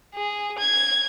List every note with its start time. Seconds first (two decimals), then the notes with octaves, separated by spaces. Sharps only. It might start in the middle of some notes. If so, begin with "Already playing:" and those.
0.15 G#4
0.58 G#6